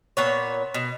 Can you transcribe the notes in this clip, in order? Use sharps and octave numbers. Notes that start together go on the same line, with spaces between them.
A#2 B3 C#5
B2